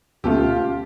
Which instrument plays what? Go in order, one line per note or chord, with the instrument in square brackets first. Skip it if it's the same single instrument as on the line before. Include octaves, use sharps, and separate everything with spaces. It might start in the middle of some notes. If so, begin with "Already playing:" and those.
[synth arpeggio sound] D2 B2 A3 [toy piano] C#4 A5 E6 [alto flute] F4 [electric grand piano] G4